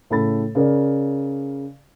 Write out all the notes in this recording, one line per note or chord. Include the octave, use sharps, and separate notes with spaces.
A2 C#3 A4 B5 A6
C#3 A#4 D5